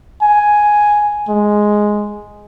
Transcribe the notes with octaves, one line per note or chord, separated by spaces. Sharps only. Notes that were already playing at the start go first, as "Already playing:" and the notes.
G#5
G#3